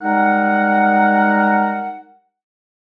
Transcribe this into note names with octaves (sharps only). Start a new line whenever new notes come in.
G3 G#3 D#4 A#4 F#5